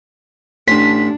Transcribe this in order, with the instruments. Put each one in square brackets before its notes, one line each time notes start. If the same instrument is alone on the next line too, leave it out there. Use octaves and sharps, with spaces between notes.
[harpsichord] A1 C6 [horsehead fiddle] D4 [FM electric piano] B6